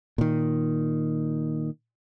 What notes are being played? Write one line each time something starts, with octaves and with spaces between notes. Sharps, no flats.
A#2 D#3